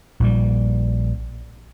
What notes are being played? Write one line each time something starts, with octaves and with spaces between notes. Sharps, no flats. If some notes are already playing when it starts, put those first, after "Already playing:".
A#1 A#2 G3